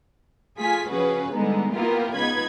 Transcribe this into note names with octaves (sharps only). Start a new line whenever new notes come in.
A3 F4 G#4 G#5 B6
C#3 F3 C#4 F#4 G#4 B4
D3 G3 G#3 B3 D#4
A#3 B3 E4 F4 G4 A#4
C#2 B3 D#4 B5 G#6